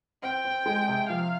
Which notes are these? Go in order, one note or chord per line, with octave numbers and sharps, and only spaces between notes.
C4 G5
C4
G#3
C3
F3 F5